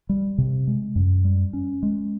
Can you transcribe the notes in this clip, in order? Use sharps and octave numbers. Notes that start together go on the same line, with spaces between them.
G3
C3
G#3
F#2
G3
C#4
G#3